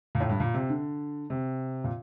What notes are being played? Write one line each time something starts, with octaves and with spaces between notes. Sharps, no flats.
A#2
A2
G2
A#2
C3
D3
C3
A#2